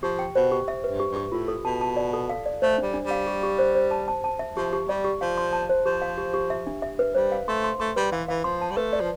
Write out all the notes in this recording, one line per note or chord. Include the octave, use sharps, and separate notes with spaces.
F3 G4
G5
B2 C5
G4
E5
B4
G2
G4
G2 G4
A2 F4
A4
B2 A5
A5
D5
A4
F5
D5
A3 C5
G3 D4
D4
G3
F5
G4
G4
C5
C5
A5
A5
A5
E5
F3 G4
G4
G3 D5
G4
F3 F5
C6
A5
C5
F3 G4
F5
G4
G4
E5
D4
E5
B4
G3 C5
F5
A3 C6
C6
A3 C6
G3 B4
E3 F5
E3 F5
F3 C6
A5
G3
A3 B4
D5
F3